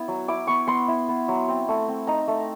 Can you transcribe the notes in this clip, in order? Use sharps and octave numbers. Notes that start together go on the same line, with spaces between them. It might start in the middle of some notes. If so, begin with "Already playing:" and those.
Already playing: B3 E4
F#3
E4 D6
B3 C#6
B3 C6
E4
B3
F#3
C4
A3
C4
D#4 A#5
A3